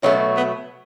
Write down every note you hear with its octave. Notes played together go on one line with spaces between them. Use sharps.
B2 F#3 A3 C#4
B3